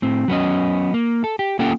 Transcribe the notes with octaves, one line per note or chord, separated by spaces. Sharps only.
A2 C4
F#3 B3 C#4 D#5
A#3
A4
G4
A#3 C#4 F4 A4 F#5 G5